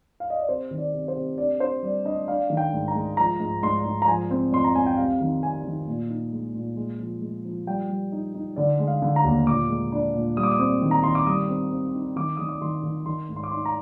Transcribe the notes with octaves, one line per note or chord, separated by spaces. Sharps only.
F5
D#5
D5
C3 C5
D#3
D5
C3
C5
C3
D4 D5
D4 C5
G3 D5
D4 D#5
D4 F5
D#3
G5
G#2
A#5
G#3
F3 A#5
G#2
G#2 C6
G#2
A#5
F3 G#5
C4
F2 C6
A#5
C4 G#5
G5
C3 F5
D#3
C3 G#5
D#3
A#2
D#4
G#3
A#2
G#3
F3
G#3
F3
G3 G5
G3
D#4
D#4
D3 D5
G#3
F5
D3
A#5
D#2
A#2 D6
G#3
D4
A#2
G3 D#6
D6
D#6
C4
D#3
A#5
D#3 C6
D6
G3 D#6
C4
C4
D#4
D#3 D6
D#3 D#6
D6
D#3 C6
D#3
D#3 C6
G#2
C6
D6
D#4 C6
A#5